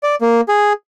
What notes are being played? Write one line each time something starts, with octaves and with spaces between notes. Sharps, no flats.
D5
A#3
G#4